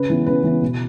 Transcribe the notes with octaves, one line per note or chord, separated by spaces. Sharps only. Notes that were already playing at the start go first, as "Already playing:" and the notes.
Already playing: C#3 B4
E3 B3
C#3 B4
E3 B3
B2